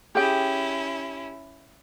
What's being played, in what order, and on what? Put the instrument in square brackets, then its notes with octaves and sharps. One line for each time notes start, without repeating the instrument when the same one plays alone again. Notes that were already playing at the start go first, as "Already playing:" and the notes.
[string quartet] C#4 E4 [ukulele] G4 G#4 G5